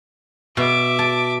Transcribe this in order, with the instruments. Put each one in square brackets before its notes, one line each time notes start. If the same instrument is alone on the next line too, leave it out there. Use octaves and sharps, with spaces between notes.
[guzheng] B2 [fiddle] E5 D6
[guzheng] A5